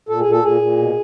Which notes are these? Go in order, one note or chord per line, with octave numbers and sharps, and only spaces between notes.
A#2 A4
G#4
A#2
A4
A#2 G#4
A#2
B2